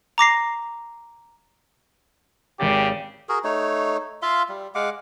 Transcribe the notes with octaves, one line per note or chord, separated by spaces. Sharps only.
A#5 D6 A#6 C7
G#1 C#3 G#3 G4 A6
F#4 G#4 A#4
A3 D#4 C#5
F4 E5 F5 C6
G3
G#3 F5 F#5 D6